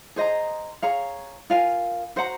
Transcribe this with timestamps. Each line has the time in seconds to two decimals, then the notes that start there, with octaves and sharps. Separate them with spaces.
0.16 G#4 C5 D#5 A#5
0.82 G#4 C#5 F5 A#5
1.50 F4 A#4 F5 G#5
2.16 F#4 C5 F#5 A#5